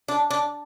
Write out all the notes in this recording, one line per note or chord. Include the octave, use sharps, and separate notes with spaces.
D4
D4